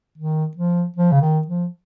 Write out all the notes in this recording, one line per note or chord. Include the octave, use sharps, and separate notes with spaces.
D#3
F3
F3
C#3
D#3
F3